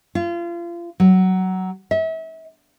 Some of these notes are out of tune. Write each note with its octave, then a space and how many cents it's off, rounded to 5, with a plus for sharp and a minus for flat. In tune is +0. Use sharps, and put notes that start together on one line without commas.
F4 -30
F#3 +15
E5 -35